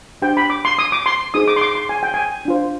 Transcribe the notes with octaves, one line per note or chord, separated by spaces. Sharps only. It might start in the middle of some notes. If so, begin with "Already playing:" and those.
D4 G4 C5 G5
B5
D6
C6
D#6
D6
C6
D#4 G#4 C5 D#6
D6
C6
D6
C6
G#5
G5
G#5
D4 F4 C5